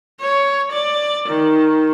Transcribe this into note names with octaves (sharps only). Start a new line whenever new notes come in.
C#5
D5
D#3